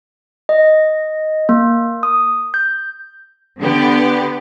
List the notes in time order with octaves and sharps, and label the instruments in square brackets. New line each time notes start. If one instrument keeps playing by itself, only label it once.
[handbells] D#5
A#3
D#6
G6
[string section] D3 B3 G4